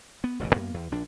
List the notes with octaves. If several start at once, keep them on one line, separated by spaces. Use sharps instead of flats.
B3
E1 A1 F#2 C#3
F#2 A#3 B3
E2
A#1 D4